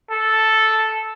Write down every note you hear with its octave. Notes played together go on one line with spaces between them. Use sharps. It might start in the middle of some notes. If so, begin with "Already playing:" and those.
A4